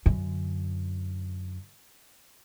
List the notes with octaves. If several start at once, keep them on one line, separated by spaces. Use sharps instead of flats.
F#2 D3